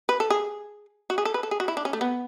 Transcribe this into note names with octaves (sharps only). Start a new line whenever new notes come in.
B4
A4
G#4
F#4
G#4
A4
B4
A4
G#4
F#4
E4
D4
C#4
A3
B3